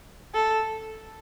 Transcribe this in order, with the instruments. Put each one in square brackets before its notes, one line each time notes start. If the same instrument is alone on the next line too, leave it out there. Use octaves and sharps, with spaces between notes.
[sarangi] A4